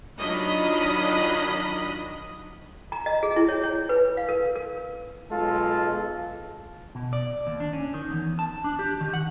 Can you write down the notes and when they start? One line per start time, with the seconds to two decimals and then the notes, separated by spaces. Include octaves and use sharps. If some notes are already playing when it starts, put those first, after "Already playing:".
0.18 D#3 F#3 D4 F4 D#5 B5
2.92 A#5
3.06 D#5
3.23 G#4
3.36 E4
3.49 C#5
3.64 C#5
3.89 B4
4.17 F5
4.29 A#4
4.55 A#4
5.31 B1 G#3 F4 A4
6.95 B2
7.13 D5
7.47 D#2
7.60 D4
7.73 C#4
7.94 D#3
8.12 E2
8.39 A5
8.64 D4
8.79 G4
9.01 D#3
9.13 F#5